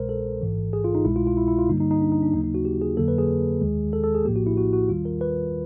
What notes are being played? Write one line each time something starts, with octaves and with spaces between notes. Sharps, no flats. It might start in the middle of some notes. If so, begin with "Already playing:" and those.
Already playing: C2 B2 G#3 A#4 C5
A4
A1 G#2 E3
G#4
F4
D#4
C2 B2 G#3 E4
F4
F4
E4
E4
F4
G2 D3 G3 A#3 D#4
D#4
D#4
D4
D#4
D4
D#2 C#3 F#3 A#3 D#4
D#4
F#4
G4
G#4
F2 D3 F#3 A#3 A4
B4
G#4
D#2 D#3 G#3
A4
A4
G#4
A#1 A2 F3 A#3 G4
F#4
E4
F#4
F#4
D#2 D#3 G3 F4
A#4
B4